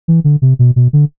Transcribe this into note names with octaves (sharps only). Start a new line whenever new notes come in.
E3
D3
C3
B2
B2
D3